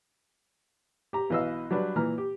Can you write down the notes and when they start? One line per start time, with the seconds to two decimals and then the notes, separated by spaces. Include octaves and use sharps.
1.13 G4 A#5
1.30 B1 E3 B4 D#5 F5 E6
1.71 F#3 G3 D4 B4 D5
1.96 A#2 E3 A#5 F6
2.18 G4